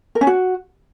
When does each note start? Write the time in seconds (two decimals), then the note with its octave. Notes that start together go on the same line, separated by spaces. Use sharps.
0.15 A#4
0.21 C#4
0.27 F#4